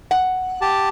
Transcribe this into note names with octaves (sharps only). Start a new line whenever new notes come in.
F#5
G4 A5